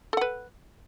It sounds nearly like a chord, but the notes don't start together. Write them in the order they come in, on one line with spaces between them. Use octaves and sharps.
A4 F#5 B4